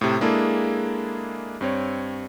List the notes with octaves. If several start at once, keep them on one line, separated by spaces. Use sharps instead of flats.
A2 C3
G#3 A#3 D4 E4 G#4 A4
G2 C4 C#5